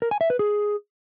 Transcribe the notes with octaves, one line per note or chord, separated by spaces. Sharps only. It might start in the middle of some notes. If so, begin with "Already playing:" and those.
A#4
G#5
E5
B4
G#4